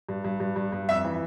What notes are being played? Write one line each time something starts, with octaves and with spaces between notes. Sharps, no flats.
G2
G2
G2
G2
G2
F2 E5
E3